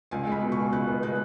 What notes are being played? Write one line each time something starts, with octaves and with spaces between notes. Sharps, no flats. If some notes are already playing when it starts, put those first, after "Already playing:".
C#2 G#5
G#3 B5
B2
C#6
G#3
C#2 F#6
B3
G#3 F#6